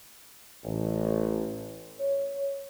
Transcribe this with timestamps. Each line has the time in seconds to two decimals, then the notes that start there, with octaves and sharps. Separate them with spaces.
0.64 A1
1.99 C#5